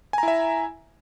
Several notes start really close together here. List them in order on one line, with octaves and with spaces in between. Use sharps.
G#5 A#5 E4 E5